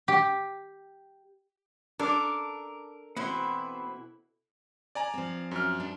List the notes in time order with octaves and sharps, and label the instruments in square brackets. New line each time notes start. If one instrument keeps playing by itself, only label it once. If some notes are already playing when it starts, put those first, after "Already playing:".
[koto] G4
[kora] D4 [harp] A4 D6 [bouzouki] A#4
[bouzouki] B2 E3 E4 [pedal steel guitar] B3 C4 C6
[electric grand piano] D5 G#5 A#5
[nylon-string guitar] F3 C4
[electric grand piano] F#2 F6
[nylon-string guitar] D4